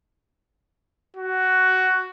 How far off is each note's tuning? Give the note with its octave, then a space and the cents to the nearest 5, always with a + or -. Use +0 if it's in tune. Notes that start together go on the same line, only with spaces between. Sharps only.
F#4 +10